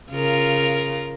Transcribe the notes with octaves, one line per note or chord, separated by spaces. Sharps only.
C#3 F4 A#4